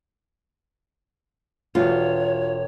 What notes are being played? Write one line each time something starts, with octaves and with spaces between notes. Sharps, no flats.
E1 F4 F#4 C#5 G6